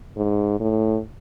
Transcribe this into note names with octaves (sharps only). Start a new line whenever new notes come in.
G#2
A2